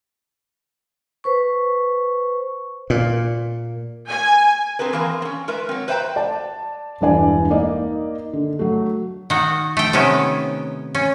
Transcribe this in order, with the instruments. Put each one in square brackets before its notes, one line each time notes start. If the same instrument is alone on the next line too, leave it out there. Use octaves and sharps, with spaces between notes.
[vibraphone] B4 C5 C#6
[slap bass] A#2
[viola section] G#5
[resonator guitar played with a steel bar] C4 G#4 A#4 B4
E3 A#3 C4 G#4 A#4
C4 C#4
G#3 A#4 B4 E5
F#3 C4
B4 C5 E5 F5 G5 A#5
[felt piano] D5 A5
E1 G2 E3 D5 G#5
A#3 D#4 D5 D#5
D3
F#3 A3
[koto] D#3 F#4
A3 G5
C3 D#3 B3 C#4
C#4